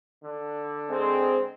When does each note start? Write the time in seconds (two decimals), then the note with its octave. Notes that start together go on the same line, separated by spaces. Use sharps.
0.23 D3
0.90 G#3 C4